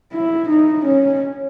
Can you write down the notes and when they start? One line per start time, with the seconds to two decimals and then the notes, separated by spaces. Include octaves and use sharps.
0.12 E4
0.49 D#4
0.86 C#4